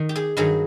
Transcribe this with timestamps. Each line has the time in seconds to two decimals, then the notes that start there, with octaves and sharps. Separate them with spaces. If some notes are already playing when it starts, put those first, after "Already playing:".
Already playing: D#3
0.09 G4
0.16 G#4
0.37 G2 D#3 F#3 G#4